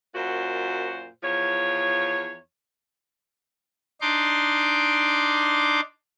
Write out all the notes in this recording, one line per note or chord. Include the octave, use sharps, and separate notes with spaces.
F#2 A#2 F#4 C5
E2 F3 C#5
D4 D#4 C6 D6